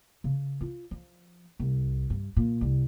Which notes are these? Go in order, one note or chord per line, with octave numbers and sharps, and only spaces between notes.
C#3
F4
F3
C2
G2
A#2
C2